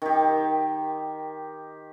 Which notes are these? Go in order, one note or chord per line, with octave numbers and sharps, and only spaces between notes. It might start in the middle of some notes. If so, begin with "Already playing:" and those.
D#3 G4